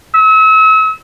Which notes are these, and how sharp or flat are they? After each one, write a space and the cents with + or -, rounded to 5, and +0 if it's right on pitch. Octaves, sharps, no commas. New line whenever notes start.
E6 -40